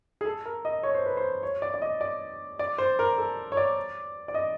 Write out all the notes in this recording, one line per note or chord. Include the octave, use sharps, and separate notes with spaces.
G#4
A4
A#4
D#5
C#5
C5
B4
C5
C#5
D5
D5
D#5
D5
D5
C5
A#4
A4
C#5
D5
D5
D#5